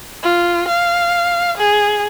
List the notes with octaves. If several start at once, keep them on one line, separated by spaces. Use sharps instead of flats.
F4
F5
G#4